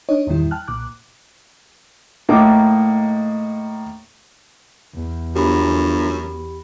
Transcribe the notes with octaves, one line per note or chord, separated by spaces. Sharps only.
D4 D#4 C#5 D#5
E2 G2 A#2 D#3 G3 E4
G5 A5 F6 F#6
B1 A#2 D6 F#6
A2 A#3 D#4 D6 D#6
E2
G1 F#2 G4 B5